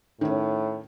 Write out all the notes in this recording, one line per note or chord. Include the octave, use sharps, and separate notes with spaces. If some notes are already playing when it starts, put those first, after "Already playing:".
A2 D#3 C#4